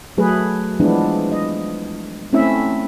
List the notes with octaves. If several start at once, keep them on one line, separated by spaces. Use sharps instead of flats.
F#3 A3 G#4 B4
E3 F3 G#3 B3 D4 E4
D#5
A3 C4 C#4 E4 E5